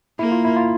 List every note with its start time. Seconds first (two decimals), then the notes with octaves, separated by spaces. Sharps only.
0.19 A#3 E4
0.32 F4
0.45 E4
0.56 F4